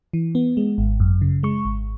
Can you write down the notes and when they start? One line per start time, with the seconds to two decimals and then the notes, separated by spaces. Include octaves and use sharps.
0.13 E3
0.35 B3
0.57 G#3
0.78 G#1
1.00 F#2
1.22 C#3
1.43 G#3 C#6
1.65 G#1